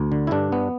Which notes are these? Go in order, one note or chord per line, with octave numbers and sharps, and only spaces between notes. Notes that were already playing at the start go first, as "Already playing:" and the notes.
Already playing: D2
D3
E4
G2 D4
B3